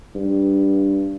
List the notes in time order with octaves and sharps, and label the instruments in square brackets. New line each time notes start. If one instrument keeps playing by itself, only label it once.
[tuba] G2